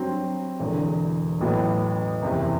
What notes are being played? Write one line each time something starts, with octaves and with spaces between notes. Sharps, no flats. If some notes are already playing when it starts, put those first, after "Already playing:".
Already playing: G2 F#3 C4
E1 E2 D3
A1 A2 F#3 B3
F#1 E2 C3